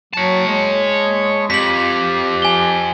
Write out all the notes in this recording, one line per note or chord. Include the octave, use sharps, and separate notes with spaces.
F#3 C#5 A5
G#3
F2 G4 B6 F#7
G#5 G7